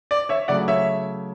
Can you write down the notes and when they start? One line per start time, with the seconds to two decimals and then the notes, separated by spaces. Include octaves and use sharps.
0.11 D5
0.29 C#5 E5
0.48 C#3 F#3 A3 D5 F#5
0.68 C#5 E5